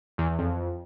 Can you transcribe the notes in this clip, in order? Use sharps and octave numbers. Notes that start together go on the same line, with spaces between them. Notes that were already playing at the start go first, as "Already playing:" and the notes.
E2
E2
F2